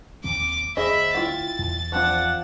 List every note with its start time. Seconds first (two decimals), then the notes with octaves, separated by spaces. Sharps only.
0.24 D#2 D#3 C4 D6
0.77 D2 G#4 C5 D#5 E5 B5
1.15 E4 F4 G5 A6
1.59 E2
1.92 F3 C4 D4 F4 F#5